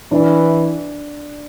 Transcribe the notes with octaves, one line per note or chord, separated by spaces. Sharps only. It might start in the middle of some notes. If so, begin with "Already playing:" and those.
E3 D4